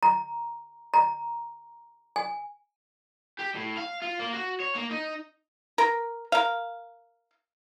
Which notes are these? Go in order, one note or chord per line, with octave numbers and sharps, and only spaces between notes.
A#5
A#5
G#5
G4
A2
F5
F4
A#3
F#4
C#5
A#3
D#4
A#4
A#4 F5